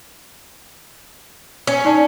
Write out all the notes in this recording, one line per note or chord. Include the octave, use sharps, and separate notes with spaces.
C#4
D#4 D5 A5